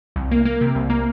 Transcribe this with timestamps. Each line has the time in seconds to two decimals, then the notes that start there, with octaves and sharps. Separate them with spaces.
0.16 C2
0.31 A#3
0.45 A#3
0.61 C3
0.75 C2
0.90 A#3